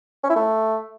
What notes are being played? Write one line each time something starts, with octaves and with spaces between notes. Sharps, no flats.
C#4
E4
A3